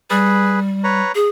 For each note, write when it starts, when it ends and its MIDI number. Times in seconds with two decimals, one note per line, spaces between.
0.10 1.01 55
0.10 0.59 68
0.10 0.59 71
0.84 1.12 71
0.84 1.12 73
0.84 1.12 82
1.15 1.29 68